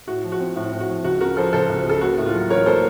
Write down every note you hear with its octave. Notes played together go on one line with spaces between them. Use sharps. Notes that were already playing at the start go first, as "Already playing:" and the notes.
A2 F#4
F3
F#4
C4
A2
A2
F#4
F3
C#2 F#4
C#3 F#4 A#4
F3 A4 C5
C#2 A4 C5
C#2
C#3 A4
A#3 F#4
A2
F4
F#3
A1 A#4 C#5
A#3 A4 C5